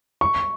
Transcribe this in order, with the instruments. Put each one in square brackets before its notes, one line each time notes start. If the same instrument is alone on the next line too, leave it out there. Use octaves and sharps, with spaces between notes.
[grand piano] C#6